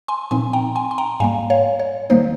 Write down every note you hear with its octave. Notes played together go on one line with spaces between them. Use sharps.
G#5 C6
A#2 F3 C4 D#4 G#5 C6
G5 A#5
G#5 C6
C6
G5 A#5
G#2 G3 A#3 F5 G#5
C#5 F5
C#5
D#3 G3 A#3 D#4 C5